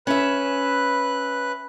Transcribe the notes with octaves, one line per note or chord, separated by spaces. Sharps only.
C#4 B4 E5 F#6